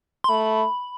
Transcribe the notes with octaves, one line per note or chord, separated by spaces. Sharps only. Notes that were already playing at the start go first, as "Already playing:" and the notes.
C6
A3 B5